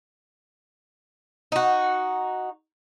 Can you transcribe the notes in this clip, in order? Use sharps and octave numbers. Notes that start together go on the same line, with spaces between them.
D#4 F#4